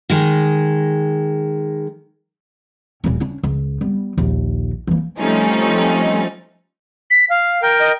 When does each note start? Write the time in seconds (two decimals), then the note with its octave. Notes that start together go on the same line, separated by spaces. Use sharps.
0.09 D#3 G#3
3.04 D#1 C#4
3.20 C#4 D4
3.43 C#2
3.81 G3 B3
4.17 A#1 D#2
4.87 E3 A#3
5.19 F3 G3 A3 C4 C#4 D#4
7.11 B6
7.30 F5
7.62 A#4 G5
7.80 D#5